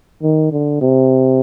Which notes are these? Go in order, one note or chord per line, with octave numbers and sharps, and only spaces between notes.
D#3
D3
C3